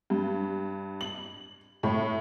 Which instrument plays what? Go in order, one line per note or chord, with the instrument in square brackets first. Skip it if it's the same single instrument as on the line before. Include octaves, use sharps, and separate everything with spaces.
[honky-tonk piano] G2
F#7
A2